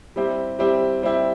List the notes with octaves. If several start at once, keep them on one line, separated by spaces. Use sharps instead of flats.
G3 C4 E4 G4
G3 C4 E4 G4
G3 C4 E4 G4